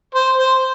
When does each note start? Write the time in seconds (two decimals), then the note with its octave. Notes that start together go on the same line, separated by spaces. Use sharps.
0.15 C5
0.38 C5